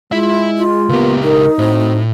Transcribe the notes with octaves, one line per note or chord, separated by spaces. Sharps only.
G#3 E4 F4 E5
F4
C#2 A#3 B3 G4
D#4 A#4
A2 C4 F#4 C5